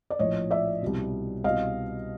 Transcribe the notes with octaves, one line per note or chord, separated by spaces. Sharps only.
D5
A#1 A2 F3 C#5 D#5
D5 E5
C2 B2
C2 B2 D#5 F5